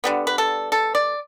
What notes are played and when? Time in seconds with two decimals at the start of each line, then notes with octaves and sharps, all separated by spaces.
0.04 D3 G3 B3
0.27 B4
0.38 A4
0.72 A4
0.95 D5